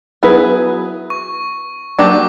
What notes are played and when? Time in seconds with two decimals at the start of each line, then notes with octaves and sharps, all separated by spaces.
0.23 F#3 B3 E4 G#4 B4
1.10 C#6
1.99 F#3 A#3 D4 G4 D6